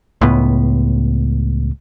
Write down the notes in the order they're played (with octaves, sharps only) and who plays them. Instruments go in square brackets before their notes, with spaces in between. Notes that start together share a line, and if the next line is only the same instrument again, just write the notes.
[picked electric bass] C#2 A2 B3